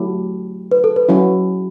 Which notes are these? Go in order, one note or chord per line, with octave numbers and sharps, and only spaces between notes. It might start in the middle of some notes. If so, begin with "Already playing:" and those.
Already playing: F#3 A3 E4 G4
B4
A4
B4
F#3 C#4 E4